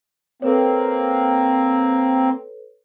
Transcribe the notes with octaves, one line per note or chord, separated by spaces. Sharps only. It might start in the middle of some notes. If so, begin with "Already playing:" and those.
A#3 C4 A4 B4 C#5